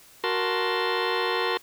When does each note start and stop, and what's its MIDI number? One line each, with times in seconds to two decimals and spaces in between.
0.24 1.57 66
0.24 1.57 70
0.24 1.57 81
0.24 1.57 84